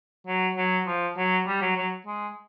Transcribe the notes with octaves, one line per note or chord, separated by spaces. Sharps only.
F#3
F#3
F3
F#3
G3
F#3
F#3
G#3